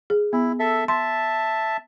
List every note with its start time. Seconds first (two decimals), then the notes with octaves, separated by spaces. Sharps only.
0.10 G#4
0.33 B3 E4
0.60 A4 E5
0.88 E5 A5 C6